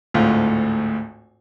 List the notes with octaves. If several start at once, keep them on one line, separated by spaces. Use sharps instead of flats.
G#1 D2 A2 F4 F5